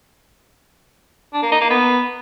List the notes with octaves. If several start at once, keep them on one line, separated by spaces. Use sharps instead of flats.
D4
A#3
D#4
A#3
B3